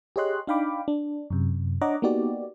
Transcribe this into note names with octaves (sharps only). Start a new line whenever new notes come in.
G4 G#4 C#5 D#5 C6 F#6
D4 D#4 F5 G5 B5 D6
D4
F#2 C3
D4 C#5 D#5 F#5 A#5 D6
A#3 B3 D#4 F#4 G4 D5